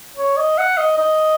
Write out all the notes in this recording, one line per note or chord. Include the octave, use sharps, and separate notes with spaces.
C#5
D#5
F#5
D#5
D#5